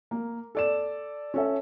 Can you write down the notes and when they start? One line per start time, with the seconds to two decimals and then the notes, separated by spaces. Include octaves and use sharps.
0.11 A#3
0.55 A4 D5 E7
1.34 C#4 A4 E5